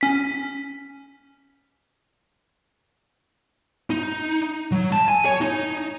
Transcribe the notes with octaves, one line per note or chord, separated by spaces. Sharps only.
C#4 B6
D#4
F#3
A5
G#5
C#5
D#4